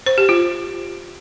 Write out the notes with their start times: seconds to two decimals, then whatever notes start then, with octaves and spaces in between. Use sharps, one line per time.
0.06 C5
0.18 G4
0.29 F4